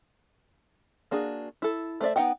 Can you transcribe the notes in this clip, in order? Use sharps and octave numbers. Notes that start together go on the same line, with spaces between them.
A#3 D4 F#4 G#4
E4 A4
A3 C5 D5 E5
B3 D#4 E5 F#5 G5